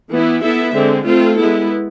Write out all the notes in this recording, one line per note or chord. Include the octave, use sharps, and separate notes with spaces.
E3 B3 E4
B3 E4 A4 E5
D3 G#3 C4
A3 C4 F4 A4
G#3 B3 E4